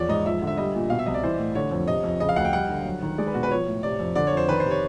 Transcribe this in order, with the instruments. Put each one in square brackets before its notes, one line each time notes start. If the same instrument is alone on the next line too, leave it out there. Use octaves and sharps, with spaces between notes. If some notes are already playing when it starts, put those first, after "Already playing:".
Already playing: [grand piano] E2 F3 [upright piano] C#5 D5
[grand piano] G#2 [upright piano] D#5
[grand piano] F3 [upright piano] E5
[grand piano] D3
[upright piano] E5
[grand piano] G3 [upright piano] D#5
[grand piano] A#2
[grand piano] B2 [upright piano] F5
[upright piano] E5
[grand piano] C2 [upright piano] D#5
[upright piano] D5
[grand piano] E3 [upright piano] C5
[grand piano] A2
[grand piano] D3 [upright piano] C#5
[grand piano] F2
[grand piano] C3 [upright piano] D#5
[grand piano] F2
[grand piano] C#3 [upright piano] D#5
[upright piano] F5
[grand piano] D2 [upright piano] F#5
[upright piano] G5
[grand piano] G3 [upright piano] F#5
[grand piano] D3
F#3
D#3
[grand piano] G#3 [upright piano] D5
[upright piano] B4
[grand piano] B2 [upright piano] F#4
[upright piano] B4
[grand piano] F3 [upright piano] C#5
[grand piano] A2
[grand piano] C3 [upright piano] D5
[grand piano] F2
[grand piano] D3 [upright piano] D5
[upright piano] C#5
[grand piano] F2 [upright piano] C5
[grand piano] D#3 [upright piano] B4
[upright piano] C5
[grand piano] C3
[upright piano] C#5